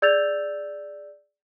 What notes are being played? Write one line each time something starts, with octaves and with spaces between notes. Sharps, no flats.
G#4 D5 E6 G6 A6 F7